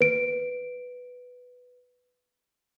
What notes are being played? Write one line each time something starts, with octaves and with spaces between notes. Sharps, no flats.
B4 D7